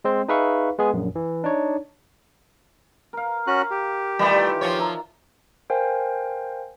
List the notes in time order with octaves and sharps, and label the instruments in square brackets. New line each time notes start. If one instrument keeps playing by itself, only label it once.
[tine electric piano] G#3 C4 C5
D#4 G#4 B4 E5 F5 C#6
G#3 B3 G#4
A#1 F#2
E3
D4 D#4 C#5
[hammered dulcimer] A#4 F5
[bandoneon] C#4 F#4 F#6
G4
[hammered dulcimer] D#3 E3 F4 [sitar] G3 A3
[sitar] F3 F4 C#5
[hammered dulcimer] D4 E5 A#5
[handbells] A#4 C5 F5 G5 G#5